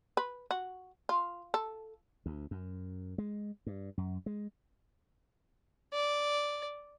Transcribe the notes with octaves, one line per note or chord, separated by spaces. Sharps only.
B4
F#4
F4
A4
D2
F#2
G#3
G2
F#2
G#3
D5